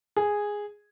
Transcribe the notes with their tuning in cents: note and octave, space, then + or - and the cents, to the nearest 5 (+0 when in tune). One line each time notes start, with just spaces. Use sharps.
G#4 -5